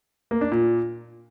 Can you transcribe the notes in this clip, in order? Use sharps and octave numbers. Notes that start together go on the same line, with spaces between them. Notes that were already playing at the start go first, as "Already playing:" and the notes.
A#3
D4
A#2